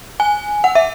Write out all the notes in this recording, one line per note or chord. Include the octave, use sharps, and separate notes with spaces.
G#5
F#5
E5